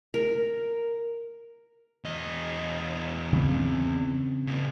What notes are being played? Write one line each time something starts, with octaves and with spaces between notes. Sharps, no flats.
A#4
E2 D#5
C#3 C4
C#3 A#3